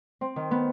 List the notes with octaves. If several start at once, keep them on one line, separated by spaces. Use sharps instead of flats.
C4
D#3
B3